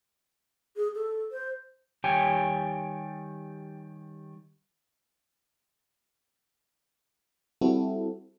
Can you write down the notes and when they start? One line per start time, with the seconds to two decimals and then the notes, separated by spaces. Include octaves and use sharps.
0.77 G#4
0.95 A4
1.32 C5
2.04 D#3 G3 G4 C#5 G5 G#5
7.61 G3 C4 E4 F#4 A4